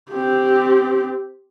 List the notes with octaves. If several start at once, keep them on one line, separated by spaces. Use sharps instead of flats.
C4 G4